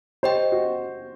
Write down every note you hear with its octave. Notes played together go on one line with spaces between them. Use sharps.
G4 C5 D#5 G5
F#4